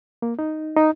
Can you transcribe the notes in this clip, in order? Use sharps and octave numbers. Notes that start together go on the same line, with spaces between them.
A#3
D#4
D#4